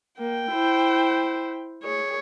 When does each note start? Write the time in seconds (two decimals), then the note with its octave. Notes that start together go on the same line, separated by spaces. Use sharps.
0.19 A#3 G5
0.52 E4 C5
1.84 G#4 C#5